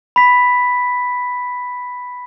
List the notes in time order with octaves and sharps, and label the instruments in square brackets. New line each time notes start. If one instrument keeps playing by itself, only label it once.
[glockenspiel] B5 B6